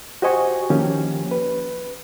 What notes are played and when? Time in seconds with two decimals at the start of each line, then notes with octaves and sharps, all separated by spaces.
0.22 F#4 G4 C5 D#5 G#5 C#6
0.70 D#3 F3 A#3 C#4 G4
1.31 B4